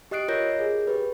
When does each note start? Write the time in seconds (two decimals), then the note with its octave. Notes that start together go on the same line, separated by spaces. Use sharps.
0.11 G4 D#5 D#6 F#6 C7 D7
0.28 F4 A#4 C#5 D#5 G6 A#6
0.59 G#4
0.87 G4 B4